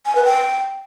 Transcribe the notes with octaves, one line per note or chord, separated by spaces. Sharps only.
G#5
B4
G5